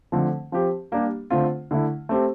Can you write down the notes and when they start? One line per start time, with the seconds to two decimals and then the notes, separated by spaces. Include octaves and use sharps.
0.12 D3 F3 A3 C4
0.52 F3 C4 G4
0.92 G3 A#3 D4 G4
1.30 D3 A3 C4 F4
1.71 D3 A3 E4
2.09 A3 C4 G4